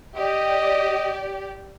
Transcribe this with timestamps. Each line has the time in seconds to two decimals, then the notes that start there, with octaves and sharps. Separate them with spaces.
0.16 G4 D5 D#5